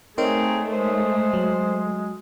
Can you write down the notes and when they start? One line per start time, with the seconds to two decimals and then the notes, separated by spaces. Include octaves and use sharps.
0.18 A3 C4 D#4 G#4 A#4 C#5
0.72 G#3 C5
1.34 F#3